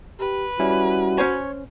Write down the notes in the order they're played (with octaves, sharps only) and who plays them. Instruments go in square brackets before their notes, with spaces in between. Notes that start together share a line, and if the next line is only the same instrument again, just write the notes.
[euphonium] G4 [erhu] B4
[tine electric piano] G3 C#4 E4 [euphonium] F#4
[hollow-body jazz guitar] C#4 C5 G#5 [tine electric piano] C#5